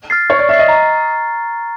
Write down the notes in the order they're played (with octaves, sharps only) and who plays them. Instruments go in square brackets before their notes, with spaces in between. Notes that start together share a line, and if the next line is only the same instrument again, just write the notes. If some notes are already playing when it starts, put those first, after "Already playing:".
[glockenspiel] F6 A6 C7
[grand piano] C#5 [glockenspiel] C#6
[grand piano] D5
[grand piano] E5 [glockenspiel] F6 A6 C7
[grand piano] D#5
[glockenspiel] A#5